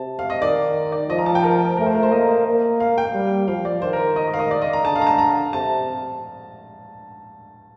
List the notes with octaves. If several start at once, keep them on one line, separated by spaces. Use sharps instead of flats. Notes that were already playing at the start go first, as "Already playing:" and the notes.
Already playing: C3 A5
F5
D#5
D#3 D5
D5
F3 D#5
A#5
A5
G5
A#4
A3 A#4
C5
A#4
C5
A#3 D#5
A#3
F5
G5
G3
F3 F5
D5
D#3 C5
A#4
D#5
D#5
F5
D#5
D5
D#5
A#5
D3 A5
F5
A#5
A5
A#5
C3 A5